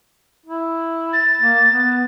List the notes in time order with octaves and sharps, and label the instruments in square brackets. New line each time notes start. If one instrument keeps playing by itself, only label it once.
[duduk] E4
[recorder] A6
[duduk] A#3
B3